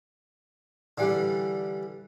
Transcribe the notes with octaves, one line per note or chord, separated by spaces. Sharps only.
D3 E3 G3